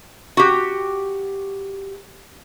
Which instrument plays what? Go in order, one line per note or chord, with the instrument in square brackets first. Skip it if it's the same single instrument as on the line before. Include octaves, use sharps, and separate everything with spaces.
[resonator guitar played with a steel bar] F#4 G4